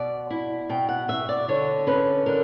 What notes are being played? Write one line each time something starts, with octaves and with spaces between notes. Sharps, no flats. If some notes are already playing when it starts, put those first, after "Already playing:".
Already playing: B2 D5
E4
B2 G5
F#5
B2 E5
D5
D3 C#5
C#4 B4
D3 A#4